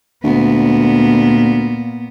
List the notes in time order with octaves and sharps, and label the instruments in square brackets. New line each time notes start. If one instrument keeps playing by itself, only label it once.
[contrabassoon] D2 [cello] A#2 B3